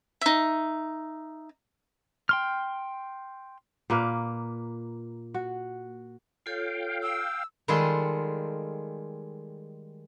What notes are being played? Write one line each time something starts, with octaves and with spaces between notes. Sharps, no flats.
D#4 E5
G5 C6 F6
A#2 A#3 B4
F#4
F4 A4 C#5 F5 G5
E6
D#3 G3 G#3 F4 G#4 A4